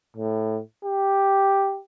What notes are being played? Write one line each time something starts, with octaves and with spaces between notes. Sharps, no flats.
A2
G4